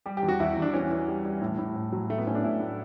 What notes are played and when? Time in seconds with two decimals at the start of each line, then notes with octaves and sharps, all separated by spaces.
0.06 G3 G4
0.17 G4
0.23 E2
0.28 F#4
0.40 E2 E4
0.56 E2
0.62 D4
0.73 E3 C#4
0.91 E3
1.08 G3
1.25 G3
1.42 A2
1.59 A2
1.76 A2
1.92 F#3
2.09 A2 A3
2.18 B3
2.27 A2 C#4
2.35 D4
2.44 A2 E4
2.61 A2